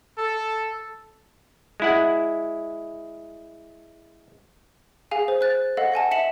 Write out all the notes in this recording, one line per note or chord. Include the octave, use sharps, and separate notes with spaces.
A4
G#3 E4 F#5
G#4 F5 G#5
C5
C5 F#6 A6
A4 D#5 F5 F#5
D#5 F#5 G#5 A5
E5 C#7 E7 F#7